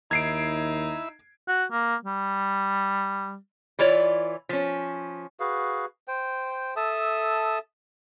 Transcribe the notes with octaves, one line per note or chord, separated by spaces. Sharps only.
D#2 D#4 E4 E6 G#6 C7 D7
F#4
A#3
G3
E3 E4 F4 C#5 D5
F3 C#4
F#4 G#4 B4 F5
C5 G5
A4 E5 A5 D#6